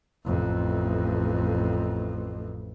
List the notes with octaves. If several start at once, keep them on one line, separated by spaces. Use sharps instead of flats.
A1 F2